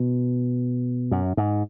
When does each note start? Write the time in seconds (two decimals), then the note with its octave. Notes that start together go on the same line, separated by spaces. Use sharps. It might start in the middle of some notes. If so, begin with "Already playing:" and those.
Already playing: B2
1.11 F#2
1.37 G#2